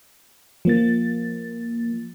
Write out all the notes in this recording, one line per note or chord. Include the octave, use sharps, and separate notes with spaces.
F3 A#3 A6